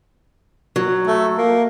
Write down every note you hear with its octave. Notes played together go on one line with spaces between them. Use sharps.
F#3
A3
A#3